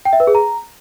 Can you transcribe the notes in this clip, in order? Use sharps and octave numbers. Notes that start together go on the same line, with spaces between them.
G5
E5
B4
G#4
A#5